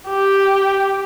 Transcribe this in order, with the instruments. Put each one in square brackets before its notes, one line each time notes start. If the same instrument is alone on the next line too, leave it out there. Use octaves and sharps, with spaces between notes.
[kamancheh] G4